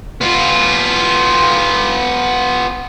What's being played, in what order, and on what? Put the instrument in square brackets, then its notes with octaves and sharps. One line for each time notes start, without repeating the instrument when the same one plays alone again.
[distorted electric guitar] B3 F4